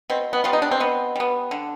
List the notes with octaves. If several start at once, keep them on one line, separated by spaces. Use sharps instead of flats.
B2 C4
B3
G3 B3 F4
D#4
D4
C4
B2 B3
G3 B3
D3